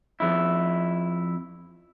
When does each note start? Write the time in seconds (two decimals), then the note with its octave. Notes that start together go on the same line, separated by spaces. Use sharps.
0.20 F2 E4